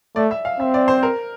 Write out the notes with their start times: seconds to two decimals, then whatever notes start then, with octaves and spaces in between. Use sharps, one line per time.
0.16 A3 D5
0.31 E5
0.45 F5
0.60 C4 E5
0.74 D5
0.88 C5
1.03 A#4